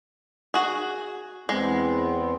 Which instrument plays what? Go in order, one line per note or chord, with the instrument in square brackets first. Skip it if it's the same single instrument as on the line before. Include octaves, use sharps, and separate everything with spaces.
[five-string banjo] F#4 G#4
[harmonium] E2 B3 C4 [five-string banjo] G#3